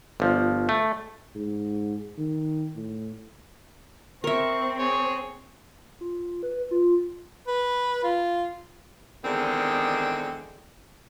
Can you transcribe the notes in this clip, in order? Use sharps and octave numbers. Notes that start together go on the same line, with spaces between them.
G1 F3
A3
G#2
D#3
A2
C4 A#4 E5 C#6
G#4 C#5
F4
B4
F4
B4
F4
E2 D3 D#3 G#3 C4